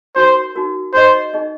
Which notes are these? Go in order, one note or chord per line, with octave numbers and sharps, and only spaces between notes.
D#4 F#4 A#4 C5
D#4 F#4 A#4
D#4 G#4 C5 D#5
D#4 G#4 D#5